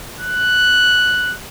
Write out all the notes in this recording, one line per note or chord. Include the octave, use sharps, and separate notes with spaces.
F#6